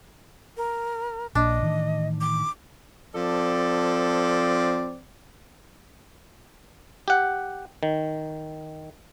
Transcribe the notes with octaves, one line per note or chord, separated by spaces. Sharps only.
A#4
A#1 A#2 D4 D#5
A2 D#3 E3
D6
F3 C4 A4 D5
G4 F#5
D#3